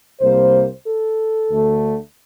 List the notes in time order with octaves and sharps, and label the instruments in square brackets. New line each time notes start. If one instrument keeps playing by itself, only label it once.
[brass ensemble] C2 C3 G3 A#3 C5
A4
D2 D3 A3